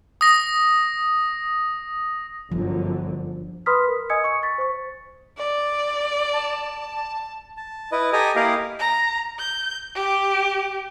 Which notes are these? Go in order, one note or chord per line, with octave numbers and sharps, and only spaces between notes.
D#6 A#6
G1 F#2 D3 F3
B4 B5 C6 D#6 F6 B6
A#4
D#5 G#5 D#6 E6 G#6 C#7
C#6 C#7
C#6 A6 B6
C5 C#6
D5
A5
A5
E4 B4 D#5
G4 A4 D#5 G#5 A#5
A#3 E4 G4 A#4 D#5 F5
A#5
G6
G4